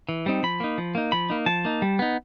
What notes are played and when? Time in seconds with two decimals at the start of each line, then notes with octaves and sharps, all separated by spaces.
0.09 E3
0.26 G3 C4 D#4
0.43 F3 B5
0.60 A#3 D#4
0.78 F3
0.95 A#3 D#4
1.12 F3 B5
1.30 A#3 D#4
1.46 F3 A5
1.65 A#3 D#4
1.82 G3
1.99 B3 D#4